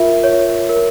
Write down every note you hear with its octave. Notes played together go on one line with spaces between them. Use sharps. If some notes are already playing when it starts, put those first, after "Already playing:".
Already playing: F4 A#4 E5
C#5
A#4